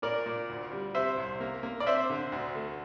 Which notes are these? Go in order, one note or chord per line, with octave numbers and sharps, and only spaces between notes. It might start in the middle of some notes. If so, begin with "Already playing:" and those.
A#2 A#4 D5
A#2
D2
G3
C3 C5 E5
C2
A#3
A#3
D5
C4 C5 E5
D3
D2
A3